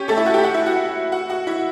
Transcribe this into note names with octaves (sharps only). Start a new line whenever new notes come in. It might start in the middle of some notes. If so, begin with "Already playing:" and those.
Already playing: C#4 G4 C#5
A3 A4
E4 E5
F#4 F#5
G4 G5
F#4 F#5
E4 E5
F#4 F#5
F#4 F#5
F#4 F#5
E4 E5